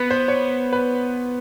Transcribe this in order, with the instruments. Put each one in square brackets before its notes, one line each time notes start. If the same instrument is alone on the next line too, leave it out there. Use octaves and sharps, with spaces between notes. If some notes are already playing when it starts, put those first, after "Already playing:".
Already playing: [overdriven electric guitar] B3 [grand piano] B4
[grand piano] C5
C#5
B4